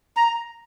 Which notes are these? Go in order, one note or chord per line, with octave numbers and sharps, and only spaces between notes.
A#5